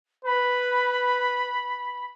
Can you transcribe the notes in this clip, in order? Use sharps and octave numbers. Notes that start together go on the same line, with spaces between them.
B4 B5